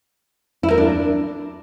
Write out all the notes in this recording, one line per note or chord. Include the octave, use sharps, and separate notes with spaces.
E4
A#4
D4